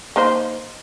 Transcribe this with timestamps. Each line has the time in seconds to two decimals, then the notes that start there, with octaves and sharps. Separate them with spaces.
0.16 A#3 D#4 C5